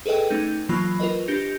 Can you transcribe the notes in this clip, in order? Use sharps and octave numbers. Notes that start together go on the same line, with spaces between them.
G#4 A4 B4 D#5 G5
A3 C#4 D#4 G6
E3 F#3 A#3 F4 B5 C7
F4 A#4 B4 D#5
D4 G4 G6 A#6 C#7 F7